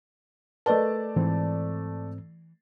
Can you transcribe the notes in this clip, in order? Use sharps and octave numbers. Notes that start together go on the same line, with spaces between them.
A3 A#4 B4 D5 D#5 A5
G#2 E3 C4